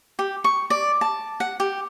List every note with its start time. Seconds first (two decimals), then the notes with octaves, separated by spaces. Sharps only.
0.19 G4
0.44 C#6
0.70 D5
1.01 A5
1.40 F#5
1.60 G4